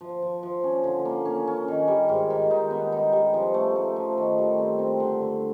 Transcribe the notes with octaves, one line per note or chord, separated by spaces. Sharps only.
F3
F3
F3
C#4
D3
A#3
C#4
C#4
D#3
G3
G#2
D#3
D#4
B3
D#4
G3
F3
A3
A3
F3
D#3
G3
C4
C4
D3
D3